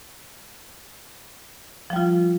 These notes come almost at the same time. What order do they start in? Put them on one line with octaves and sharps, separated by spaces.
F3 G3 F4